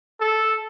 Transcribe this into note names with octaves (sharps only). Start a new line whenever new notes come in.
A4